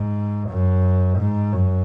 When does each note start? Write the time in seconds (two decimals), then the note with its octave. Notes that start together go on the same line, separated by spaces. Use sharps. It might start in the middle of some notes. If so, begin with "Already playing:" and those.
Already playing: G#2
0.50 F#2
1.19 G#2
1.53 F#2